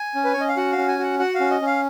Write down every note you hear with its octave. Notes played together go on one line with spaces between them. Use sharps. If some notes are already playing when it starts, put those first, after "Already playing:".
Already playing: G#5
C#4
B4
C#5
C#4 D#5
F5
F#4 F#5
F5
C#4
G#5
F#4 F#5
F#4 F#5
F5
C#4
D#5
C#4
F5